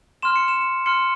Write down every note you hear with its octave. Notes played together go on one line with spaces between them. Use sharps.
C6 F6 E7
C#7
E7
C6 F6 C#7